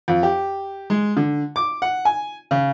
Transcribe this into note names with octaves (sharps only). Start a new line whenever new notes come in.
F2
G4
G#3
D3
D6
F#5
G#5
C#3